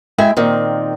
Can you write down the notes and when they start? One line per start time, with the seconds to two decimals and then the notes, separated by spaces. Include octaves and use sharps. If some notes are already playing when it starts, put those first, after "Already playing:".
0.18 G#3 E4 G5 G#5
0.37 A#2 D#3 C4